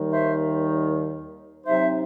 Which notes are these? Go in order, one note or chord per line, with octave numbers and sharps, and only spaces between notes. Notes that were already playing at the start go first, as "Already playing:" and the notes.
Already playing: D#2 D#3 G3 D#4
C5 E5
C3 F#3 C4 D#4 C5 E5